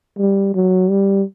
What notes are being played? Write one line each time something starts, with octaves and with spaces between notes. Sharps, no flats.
G3
F#3
G3